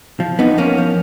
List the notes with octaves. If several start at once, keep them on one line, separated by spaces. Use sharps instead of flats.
F3
F2 B3 D#4
F2 A#3 C#4
F3